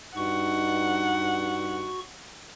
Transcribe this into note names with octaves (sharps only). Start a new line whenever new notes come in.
G2 D#4 F#4 F#5 C#6